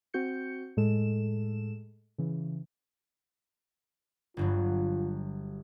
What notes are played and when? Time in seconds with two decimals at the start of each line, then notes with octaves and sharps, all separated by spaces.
0.14 C4 F#4 G6 C#7
0.77 A2 G#3 A4 E7
2.18 C#3 E3
4.37 G1 G2 F#3 F4